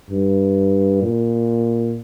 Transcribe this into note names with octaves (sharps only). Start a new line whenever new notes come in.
G2
A#2